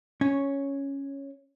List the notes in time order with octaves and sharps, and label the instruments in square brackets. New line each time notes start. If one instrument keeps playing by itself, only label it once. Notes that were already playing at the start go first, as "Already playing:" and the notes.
[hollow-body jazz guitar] C#4 C#5